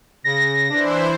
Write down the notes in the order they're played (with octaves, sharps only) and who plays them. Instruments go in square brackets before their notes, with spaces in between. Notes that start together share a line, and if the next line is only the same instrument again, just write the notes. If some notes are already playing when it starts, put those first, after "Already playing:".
[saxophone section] C#3 [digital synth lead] A#6
[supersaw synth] E3 E4 C5 [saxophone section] D4